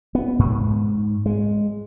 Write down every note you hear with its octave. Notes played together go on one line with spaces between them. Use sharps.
B3
G#2
G#3